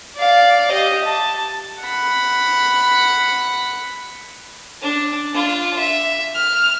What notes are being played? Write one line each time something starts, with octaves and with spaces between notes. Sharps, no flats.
D5 F5
G4 D#5
A5
F#5 B5
D4
D4 F4
E5
F6